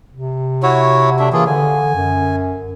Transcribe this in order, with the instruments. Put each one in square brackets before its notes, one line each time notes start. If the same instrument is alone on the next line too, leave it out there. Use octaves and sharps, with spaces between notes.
[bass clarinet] C3
[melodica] E4 F#4 C#5
A3 D4 E5
[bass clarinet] E3 [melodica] A#3 F4 G#4
[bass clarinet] D3 [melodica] G#5
[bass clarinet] F#2